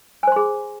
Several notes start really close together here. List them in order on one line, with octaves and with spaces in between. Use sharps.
G#5 C5 C6 G#4